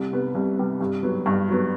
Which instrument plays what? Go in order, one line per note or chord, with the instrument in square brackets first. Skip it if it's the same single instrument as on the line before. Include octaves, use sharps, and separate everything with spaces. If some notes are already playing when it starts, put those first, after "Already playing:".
Already playing: [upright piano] C2
C3 G3 B3
C2
C3 G3 B3
G2
F#3 B3
G2
F#3 B3